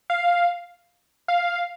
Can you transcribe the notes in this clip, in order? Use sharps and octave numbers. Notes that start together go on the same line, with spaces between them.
F5
F5